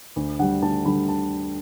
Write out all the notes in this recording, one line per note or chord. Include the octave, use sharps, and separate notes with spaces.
D2
D3 G3 F#5
D2 A5
D3 G3 B5
A5